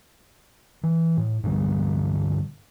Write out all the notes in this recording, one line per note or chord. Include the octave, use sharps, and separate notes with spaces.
E3
A2
G2 A#2 D3 G3